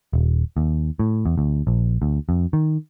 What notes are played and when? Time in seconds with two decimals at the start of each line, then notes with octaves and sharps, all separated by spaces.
0.13 D#1
0.57 D#2
0.99 A2
1.26 E2
1.38 D2
1.67 A#1
2.02 D2
2.29 F2
2.53 D#3